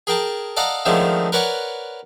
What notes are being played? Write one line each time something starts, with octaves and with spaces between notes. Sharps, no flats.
G#4 A#4 G5 A5
A4 D5 D#5 F5 F#5 A#5
D3 D#3 F3 G#3 A3 C#4
A#4 B4 C#5 D5 F#5 G#5